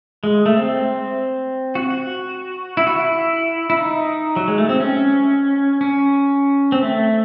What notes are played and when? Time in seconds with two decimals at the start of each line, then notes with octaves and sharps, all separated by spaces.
0.24 G#3
0.46 A3
0.57 C4
1.75 F#4
1.90 F#4
2.77 E4
2.87 F#4
2.96 E4
3.70 E4
3.78 D#4
4.36 F#3
4.48 G#3
4.58 A3
4.69 C4
4.80 C#4
5.81 C#4
6.72 C4
6.83 A3